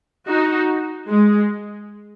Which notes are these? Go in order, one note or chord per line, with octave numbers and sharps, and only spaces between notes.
D#4 F#4
G#3